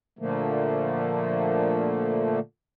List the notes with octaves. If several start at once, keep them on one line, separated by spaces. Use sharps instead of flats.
A#2 D3 F3 A3 A#3